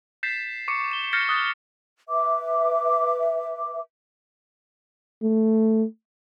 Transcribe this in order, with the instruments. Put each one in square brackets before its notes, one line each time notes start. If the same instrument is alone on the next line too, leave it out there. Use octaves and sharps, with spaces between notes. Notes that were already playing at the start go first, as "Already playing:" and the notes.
[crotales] G6 A6 B6 C7 E7
C#6 D6 C#7
E7 G7
F6 G6 A6 A#6 C7 C#7
D#6 F#6 A6
[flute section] B4 E5 D6
[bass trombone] A3